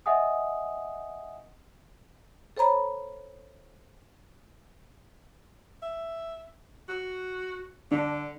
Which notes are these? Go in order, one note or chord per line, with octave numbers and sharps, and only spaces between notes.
D#5 E5 F#5 G#5 D#6
A4 C5 C#5 A#5 B5
E5
F#4
D3 D4